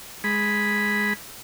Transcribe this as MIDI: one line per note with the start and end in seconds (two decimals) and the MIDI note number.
0.24 1.13 56
0.24 1.13 83